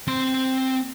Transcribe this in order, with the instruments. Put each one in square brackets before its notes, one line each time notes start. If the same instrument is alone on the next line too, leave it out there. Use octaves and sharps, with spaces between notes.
[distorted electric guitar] C4 C6